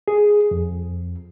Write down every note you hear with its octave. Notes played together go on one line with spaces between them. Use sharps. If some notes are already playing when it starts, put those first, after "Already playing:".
G#4
F2